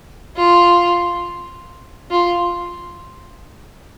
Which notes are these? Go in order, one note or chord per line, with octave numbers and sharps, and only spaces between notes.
F4
F4